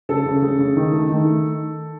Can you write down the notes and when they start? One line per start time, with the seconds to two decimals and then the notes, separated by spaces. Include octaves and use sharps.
0.09 C#3 A4
0.26 C#3
0.42 C#3
0.59 C#3
0.76 D#3
0.93 A3
1.10 D#3